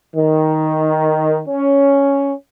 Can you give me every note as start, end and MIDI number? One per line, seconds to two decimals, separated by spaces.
0.16 1.41 51
1.48 2.33 61